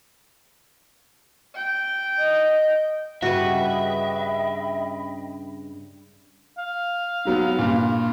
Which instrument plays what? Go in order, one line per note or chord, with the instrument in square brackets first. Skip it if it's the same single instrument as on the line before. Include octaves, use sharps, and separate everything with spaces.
[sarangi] G5
[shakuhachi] D#5
[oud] G2 C#3 [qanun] F#4 B4 [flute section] D#5 G5 B5 [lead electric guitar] E5
[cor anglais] F5
[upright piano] G#2 F#3 B3
G2 A#2